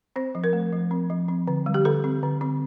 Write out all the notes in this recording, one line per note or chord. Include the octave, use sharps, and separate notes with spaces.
C4 C5
F3
A#4
A3
F3
C4
F3
C4
D3
G3
G4
D3 A4
C4
D3
C4